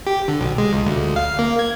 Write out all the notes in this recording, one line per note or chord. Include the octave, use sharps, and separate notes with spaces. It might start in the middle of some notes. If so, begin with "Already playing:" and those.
G4
D3
B1
G#3
C#2
D2
F5
A#3
G#6